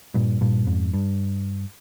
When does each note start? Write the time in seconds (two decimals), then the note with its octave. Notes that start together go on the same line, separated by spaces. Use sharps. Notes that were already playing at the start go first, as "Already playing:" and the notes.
0.14 G2 A#2
0.41 G2 A#2
0.67 F2 G#2
0.93 G2